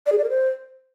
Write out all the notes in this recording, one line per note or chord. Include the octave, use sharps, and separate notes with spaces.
D5
G#4
D5
A#4
C5